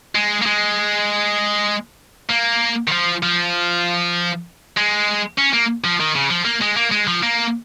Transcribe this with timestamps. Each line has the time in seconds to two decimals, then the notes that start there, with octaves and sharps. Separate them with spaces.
0.15 G#3
0.42 A#3
0.46 G#3
2.30 A#3
2.87 D#3
2.92 F3
3.23 F3
4.77 G#3
5.38 C#4
5.53 A#3
5.84 F3
6.00 D#3
6.15 C#3
6.30 F3
6.45 A#3
6.61 G#3
6.76 A#3
6.91 G#3
7.07 F3
7.23 A#3